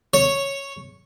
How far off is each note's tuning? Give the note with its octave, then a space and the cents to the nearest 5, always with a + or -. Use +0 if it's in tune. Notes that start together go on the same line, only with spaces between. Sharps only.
C#5 -5